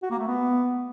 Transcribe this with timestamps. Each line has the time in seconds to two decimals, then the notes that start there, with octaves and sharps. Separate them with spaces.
0.03 F#4
0.11 A#3
0.19 A3
0.27 B3